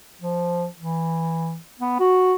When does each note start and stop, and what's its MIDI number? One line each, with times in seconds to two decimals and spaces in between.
0.22 0.66 53
0.80 1.57 52
1.80 1.96 59
2.00 2.35 66